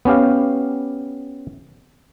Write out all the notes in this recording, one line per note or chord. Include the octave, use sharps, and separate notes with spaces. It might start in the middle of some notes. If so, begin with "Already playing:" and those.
B3 C#4 G4 F5